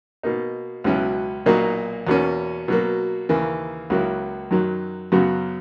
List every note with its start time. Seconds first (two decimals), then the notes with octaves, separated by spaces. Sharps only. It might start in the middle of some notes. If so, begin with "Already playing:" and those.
0.23 B2 A#3 D#4
0.84 C#2 B2 F#3 C#4 E4
1.46 B1 A#2 A#3 D#4 F#4
2.07 E2 B2 A#3 C#4
2.68 B2 F#3 A#3
3.29 D#2 C#3 E3 A#3
3.90 C#2 C#3 F#3 A#3 E4
4.51 F#2 D#3 F#3
5.12 F#2 C#3 F#3 B3 F#4